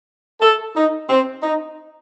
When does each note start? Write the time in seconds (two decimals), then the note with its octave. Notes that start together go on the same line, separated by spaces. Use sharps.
0.41 A4
0.75 D#4
1.09 C4
1.43 D#4